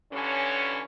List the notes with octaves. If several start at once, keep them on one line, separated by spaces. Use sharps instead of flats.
G2 D3 E3 C#4